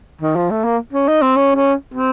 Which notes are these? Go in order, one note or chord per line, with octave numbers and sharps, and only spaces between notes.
D#3
F3
A3
A#3
C#4
D#4
C4
C#4
C#4
C4